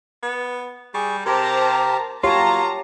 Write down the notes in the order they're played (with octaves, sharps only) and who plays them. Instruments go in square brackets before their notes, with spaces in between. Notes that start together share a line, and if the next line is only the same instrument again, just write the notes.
[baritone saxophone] B3
[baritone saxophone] G3 [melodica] G#4 C#6
[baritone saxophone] C3 [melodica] G4 A#4 [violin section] C5 A5 A#5
[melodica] F#3 A#3 [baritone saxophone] F4 [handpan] G4 C#5 [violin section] A5 A#5